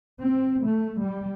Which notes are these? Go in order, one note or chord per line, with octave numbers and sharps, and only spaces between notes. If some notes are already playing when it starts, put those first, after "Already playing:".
C4
A3
G3